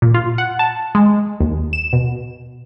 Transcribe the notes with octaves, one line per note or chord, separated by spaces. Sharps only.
A#2
F4
F#5
A5
G#3
D#2
E7
B2